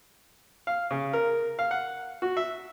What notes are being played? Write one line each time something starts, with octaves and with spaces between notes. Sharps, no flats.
F5
C#3
A#4
F5
F#5
F#4
E5